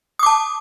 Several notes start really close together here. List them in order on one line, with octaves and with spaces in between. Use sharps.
D#6 D6 A5